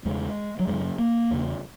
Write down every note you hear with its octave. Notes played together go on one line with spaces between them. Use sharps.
E2 C#3 G#3
F#3
F#2 C#3 G#3
A#3
E2 C#3